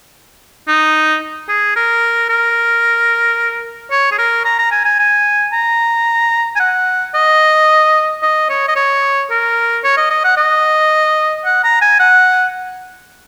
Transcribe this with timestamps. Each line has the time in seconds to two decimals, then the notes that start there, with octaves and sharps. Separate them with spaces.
0.68 D#4
1.49 G#4
1.76 A#4
2.29 A#4
3.91 C#5
4.12 G#4
4.19 A#4
4.45 A#5
4.59 A#5
4.72 G#5
4.85 G#5
4.99 G#5
5.53 A#5
6.56 G#5
6.60 F#5
7.14 D#5
8.23 D#5
8.50 C#5
8.68 D#5
8.76 C#5
9.30 A#4
9.84 C#5
9.97 D#5
10.10 D#5
10.24 F#5
10.37 D#5
11.45 F#5
11.64 A#5
11.81 G#5
11.99 F#5